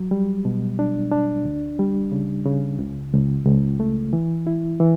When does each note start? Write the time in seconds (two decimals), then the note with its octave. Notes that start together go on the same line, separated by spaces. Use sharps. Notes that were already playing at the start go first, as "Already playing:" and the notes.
Already playing: F#3
0.11 G3
0.45 B2
0.79 D4
1.12 D4
1.45 D2
1.79 G3
2.12 C#3
2.46 C#3
2.79 C#2
3.13 C#2
3.46 C#2
3.80 A3
4.13 E3
4.47 E4
4.80 E3